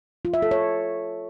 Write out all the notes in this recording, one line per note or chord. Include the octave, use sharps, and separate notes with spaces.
F4
E5
A4
C#5